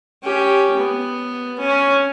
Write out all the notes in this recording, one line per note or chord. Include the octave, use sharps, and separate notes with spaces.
C#4 G4
B3
C#4